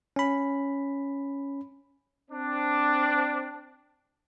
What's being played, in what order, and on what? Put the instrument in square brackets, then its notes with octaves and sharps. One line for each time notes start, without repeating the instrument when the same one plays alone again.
[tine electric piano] C#4 B5
[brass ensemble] C4 D4